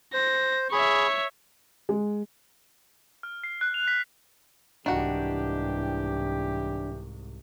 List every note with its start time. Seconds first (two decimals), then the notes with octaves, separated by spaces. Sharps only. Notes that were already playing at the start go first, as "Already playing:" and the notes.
0.14 C5 A#6
0.72 G#4 C#5 E5 B5
1.89 G#3
3.23 F6
3.44 C7
3.61 F#6
3.74 F7
3.88 B6
4.86 C2 G#2 D#3 E3 D4 F#4 G4